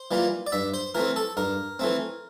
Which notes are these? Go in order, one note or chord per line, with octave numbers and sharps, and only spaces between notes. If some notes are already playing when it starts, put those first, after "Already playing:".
Already playing: C5
E3 G3 A#3 F4
D5
G2 E5
C5
E3 A3 C4 A#4
A4
G2 A#4
E3 A3 C4